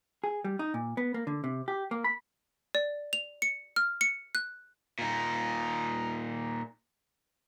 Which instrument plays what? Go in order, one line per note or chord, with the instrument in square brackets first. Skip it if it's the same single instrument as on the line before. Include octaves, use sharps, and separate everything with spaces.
[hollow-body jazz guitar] G#4
G3
D#4
A#2
B3
A#3
D3
C3
G4
A#3
B5
[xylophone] D5
F7
C#7
F6
C#7
F#6
[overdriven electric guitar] A#2 D#4